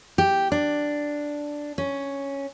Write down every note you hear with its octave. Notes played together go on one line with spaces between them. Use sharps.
G4
D4
C#4